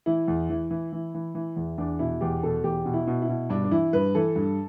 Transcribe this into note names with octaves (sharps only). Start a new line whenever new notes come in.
E3 E4
E2
E3
E3
E3
E3
E3
E2
E2 D4
B2 E4
E2 G4
B2 A4
E2 G4
B2
E4
B2
E4
B2
G2 D4
D4
E3 E4
G2 B4
E3 A4
G2